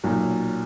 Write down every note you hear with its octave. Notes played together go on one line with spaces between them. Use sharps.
B1 A#2 F#3